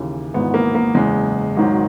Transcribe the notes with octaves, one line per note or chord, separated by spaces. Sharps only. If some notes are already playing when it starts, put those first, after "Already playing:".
Already playing: D#2 C#3 E3
G#1 G#2 E3 B3
A#3
A#3
F#1 E2 C#3 G#3
G#1 G#2 D#3 F#3